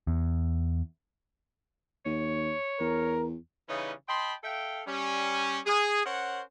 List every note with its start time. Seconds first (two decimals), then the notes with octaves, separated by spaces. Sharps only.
0.07 E2
2.05 D#2 C#5
2.80 E2 A#4
3.69 C#3 E3 G3 C#4 D#4 B4
4.09 D#5 G5 A5 B5 C6
4.44 A4 E5 F5 G5
4.87 G3 C#4
5.66 G#4
6.06 C#4 A#4 C5 C#5 F#5